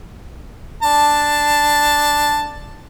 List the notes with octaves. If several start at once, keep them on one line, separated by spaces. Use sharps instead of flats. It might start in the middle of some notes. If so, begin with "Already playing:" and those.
D4 A5